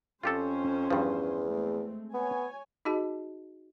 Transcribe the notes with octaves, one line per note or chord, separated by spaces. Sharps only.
F2 C#4 F4 G4 A4 C5
E2 G2 F3
G#3 A3 C4
B3 C#5 G#5
D#4 F#4 G#4 D#5 A5